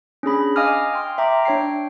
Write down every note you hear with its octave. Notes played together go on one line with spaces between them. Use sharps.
C#4 D4 G#4 B5
D#5 F5 G#5 D6 D#6 F6
G5 C6 F6
E5 G5 A#5 D6
D4 C#5 G5 C7